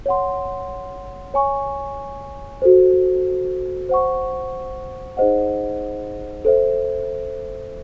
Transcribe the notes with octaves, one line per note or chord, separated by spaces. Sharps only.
C#5 F#5 C6
C#5 G#5 C#6
F#4 A4 C5
C5 F#5 C#6
D#4 G#4 C5 D#5 F#5
A4 C5 E5